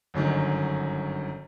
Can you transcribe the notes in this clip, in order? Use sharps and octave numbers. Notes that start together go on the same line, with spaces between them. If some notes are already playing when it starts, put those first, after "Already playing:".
G1 F#2 D3 D#3